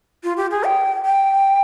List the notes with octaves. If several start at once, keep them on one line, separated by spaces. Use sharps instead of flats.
F4
G4
G#4
G5
G5